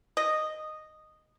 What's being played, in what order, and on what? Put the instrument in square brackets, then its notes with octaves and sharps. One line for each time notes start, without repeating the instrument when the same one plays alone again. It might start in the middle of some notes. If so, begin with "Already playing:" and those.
[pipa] D#5